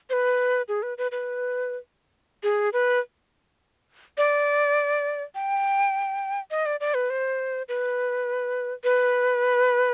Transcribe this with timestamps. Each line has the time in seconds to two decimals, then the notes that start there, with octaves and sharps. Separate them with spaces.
0.10 C5
0.13 B4
0.68 G#4
0.83 B4
0.98 B4
1.11 B4
2.43 G#4
2.73 B4
4.18 D5
5.35 G5
6.51 D#5
6.66 D5
6.80 D5
6.94 B4
7.10 C5
7.68 B4
8.84 B4